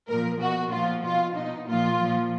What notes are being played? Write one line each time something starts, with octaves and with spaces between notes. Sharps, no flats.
A#2 F3 A#4
B2 F#4
A#2 F3 F4
B2 F4
B2 D#4
A#2 F3 F4
A#2 F3